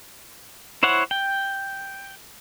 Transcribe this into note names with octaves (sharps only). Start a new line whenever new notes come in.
E4 C5 C#5 F#5
G5